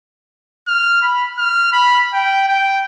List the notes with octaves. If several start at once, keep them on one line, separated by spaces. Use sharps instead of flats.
F6
B5
F6
B5
G5
G5